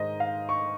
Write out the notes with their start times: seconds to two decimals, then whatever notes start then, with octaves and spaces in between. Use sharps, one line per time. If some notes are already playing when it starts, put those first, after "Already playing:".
Already playing: G#2 D#3 G#3 C5 D#5
0.20 F5
0.49 C#6